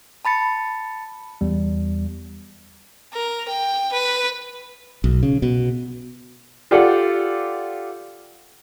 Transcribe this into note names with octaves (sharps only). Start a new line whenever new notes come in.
A5 B5 A6 C#7
E2 G3
A#4
G5
B4
B1
C#3
B2
F4 G4 A4 D5 F#5